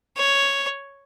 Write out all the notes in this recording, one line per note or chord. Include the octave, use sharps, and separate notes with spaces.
C#5